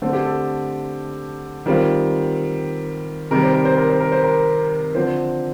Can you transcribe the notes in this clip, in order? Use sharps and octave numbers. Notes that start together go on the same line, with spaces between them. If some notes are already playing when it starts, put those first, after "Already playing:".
D3 A3 C4 A4
G4
A4
D#3 G3 C4 F4
C3 D#3 G3 A#4
C5
A#4
C5
A#4
C5
A#4
C5
A#4
D3 F3 C4 C5